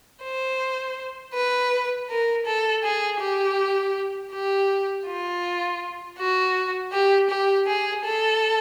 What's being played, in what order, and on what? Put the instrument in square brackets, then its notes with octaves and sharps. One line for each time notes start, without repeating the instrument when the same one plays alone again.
[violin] C5
B4
A#4
A4
G#4
G4
G4
F4
F#4
G4
G4
G#4
A4